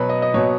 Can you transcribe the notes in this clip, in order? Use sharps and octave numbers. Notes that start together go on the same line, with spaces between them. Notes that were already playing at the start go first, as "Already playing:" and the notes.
Already playing: B2 F#3 B4
D#5
D#5
B2 F#3 C#5